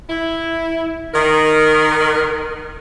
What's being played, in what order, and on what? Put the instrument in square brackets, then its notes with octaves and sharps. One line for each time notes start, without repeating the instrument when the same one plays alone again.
[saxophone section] E4
D#3 A#4